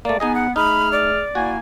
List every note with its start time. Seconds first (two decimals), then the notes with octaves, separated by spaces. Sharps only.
0.05 A3 A#3 D5
0.20 B3 D#4 G#4 D#5 G#5
0.35 F#5
0.56 A3 D#4 G#4 B5 F6
0.92 D5
1.35 A#3 E4 F#4 G#5